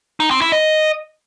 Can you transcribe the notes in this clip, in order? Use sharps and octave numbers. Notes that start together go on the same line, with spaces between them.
D#4
C4
E4
D#5